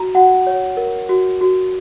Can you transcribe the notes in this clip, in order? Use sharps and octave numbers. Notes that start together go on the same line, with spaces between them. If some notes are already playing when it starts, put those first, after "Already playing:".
Already playing: F#4 A#5
F#4 F#5
C#5
A#4
F#4
F#4